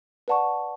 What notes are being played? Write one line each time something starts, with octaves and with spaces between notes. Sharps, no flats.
B4 D5 F#5 A5 C#6